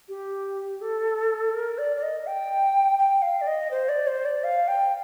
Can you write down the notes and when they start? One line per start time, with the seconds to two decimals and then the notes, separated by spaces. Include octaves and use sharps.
0.09 G4
0.81 A4
1.53 A#4
1.78 D5
1.97 D5
2.03 D#5
2.27 G5
2.99 G5
3.22 F5
3.41 D5
3.47 D#5
3.71 C5
3.89 D5
4.07 C5
4.25 D5
4.44 F5
4.68 G5